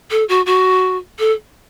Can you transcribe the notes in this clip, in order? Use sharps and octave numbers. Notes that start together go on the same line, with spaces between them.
A4
F#4
F#4
A4